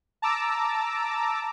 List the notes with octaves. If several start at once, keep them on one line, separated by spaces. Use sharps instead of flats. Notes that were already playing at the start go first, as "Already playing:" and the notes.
A5 A#5 D6 E6